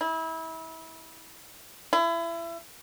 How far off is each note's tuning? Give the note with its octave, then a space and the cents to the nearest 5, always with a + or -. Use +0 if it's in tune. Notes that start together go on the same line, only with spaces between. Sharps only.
E4 -30
E4 +30